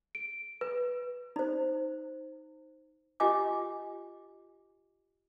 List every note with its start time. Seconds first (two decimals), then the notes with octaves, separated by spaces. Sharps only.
0.15 D7
0.61 B4
1.36 D#4 C5
3.20 F4 G4 D#5 G#5 D6